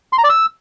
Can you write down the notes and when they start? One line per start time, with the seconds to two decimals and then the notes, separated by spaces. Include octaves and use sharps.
0.13 C6
0.18 A#5
0.24 D5
0.29 E6